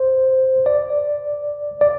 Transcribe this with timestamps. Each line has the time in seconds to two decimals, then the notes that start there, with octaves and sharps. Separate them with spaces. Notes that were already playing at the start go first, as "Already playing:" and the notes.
Already playing: C5
0.66 D5
1.81 D5